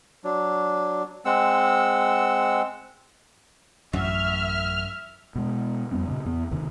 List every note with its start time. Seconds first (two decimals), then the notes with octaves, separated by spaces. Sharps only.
0.24 F#3 D4
1.25 G#3 C4 F#5 E6
3.93 A1 F#2 F#3 C#4 E5 F6
5.36 B2 G#3
5.91 F2 G3 B3 C4
6.08 A#2 C#3
6.25 E2 B3
6.51 D#2 C3 D#3